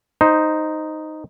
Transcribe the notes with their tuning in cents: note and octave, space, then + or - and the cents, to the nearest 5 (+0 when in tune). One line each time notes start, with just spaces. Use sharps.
D#4 +0 C5 +0